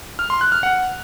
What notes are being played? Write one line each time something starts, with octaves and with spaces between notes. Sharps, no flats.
F6
C6
F#6
F6
F#5